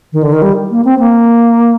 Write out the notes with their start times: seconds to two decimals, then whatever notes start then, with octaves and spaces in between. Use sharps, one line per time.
0.13 D#3
0.23 D3
0.32 D#3
0.42 G3
0.71 A#3
0.85 C4
1.00 A#3